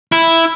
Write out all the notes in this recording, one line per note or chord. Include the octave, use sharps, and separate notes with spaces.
E4